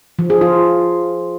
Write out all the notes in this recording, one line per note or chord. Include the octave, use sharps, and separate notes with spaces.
F3
G#4
F4